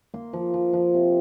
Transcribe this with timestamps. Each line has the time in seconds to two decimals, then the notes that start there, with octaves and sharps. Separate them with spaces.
0.14 A#3 C6
0.33 F3
0.54 F3
0.73 F3
0.94 C3